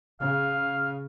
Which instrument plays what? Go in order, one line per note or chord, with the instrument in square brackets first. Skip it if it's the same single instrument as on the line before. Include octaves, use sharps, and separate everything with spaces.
[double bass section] C#3 [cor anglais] F5